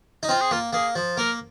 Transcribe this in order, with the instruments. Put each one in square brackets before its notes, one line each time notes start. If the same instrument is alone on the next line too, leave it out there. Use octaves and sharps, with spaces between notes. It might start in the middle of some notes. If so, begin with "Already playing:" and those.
[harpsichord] D#4
[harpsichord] C4 [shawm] F4
[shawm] G#4
[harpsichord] A#3 [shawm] F4
[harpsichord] A#3 [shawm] G#4
[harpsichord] F3
[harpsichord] A#3 [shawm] A#4